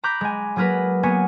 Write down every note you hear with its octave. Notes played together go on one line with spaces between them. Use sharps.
A#5 B5 D6 F#6 G6
G#3 G#5
F#3 A#3 G#4 A#4 B4
A#3 B3 C#5 G#5